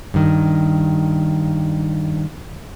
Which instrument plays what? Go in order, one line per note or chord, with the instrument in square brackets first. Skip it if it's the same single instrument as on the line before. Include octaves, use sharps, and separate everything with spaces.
[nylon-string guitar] G2 D#3